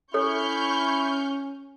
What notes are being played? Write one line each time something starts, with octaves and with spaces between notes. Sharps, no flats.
C#4 E4 A4 C#5 C#6 F6 G6